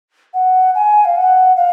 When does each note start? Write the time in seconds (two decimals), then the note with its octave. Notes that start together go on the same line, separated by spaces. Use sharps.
0.34 F#5
0.75 G#5
1.05 F5
1.16 F#5
1.56 F5